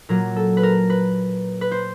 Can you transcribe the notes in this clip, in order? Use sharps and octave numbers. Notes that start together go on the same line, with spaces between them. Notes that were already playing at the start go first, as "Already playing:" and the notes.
A#2 F#3 A#3 A#4
A4
B4
A#4
B4
B4
C5